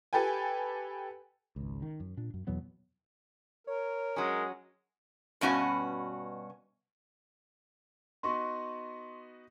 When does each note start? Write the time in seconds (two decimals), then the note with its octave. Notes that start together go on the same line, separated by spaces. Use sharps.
0.13 G4 A4 B4 G5 G#5
1.56 G#1 C#2
1.82 D#3
2.00 F#2
2.17 A#2 D4
2.34 F#2
2.47 E2 B2 F#3 B3
3.67 A#4 C#5
4.16 F#3 G#3 C#4
5.41 G2 B2 C#4 F#4 D#5
8.23 B3 D#4 F#4 C6 C#6